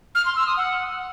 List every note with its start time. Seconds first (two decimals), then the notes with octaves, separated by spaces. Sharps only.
0.15 F6
0.25 C6
0.36 E6
0.47 D#6
0.57 F#5